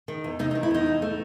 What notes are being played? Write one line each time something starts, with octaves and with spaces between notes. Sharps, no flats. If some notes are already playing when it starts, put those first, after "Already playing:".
D#3
E2
C3 D#4
D#4
D#3
E4
E2 D#4
E2
A3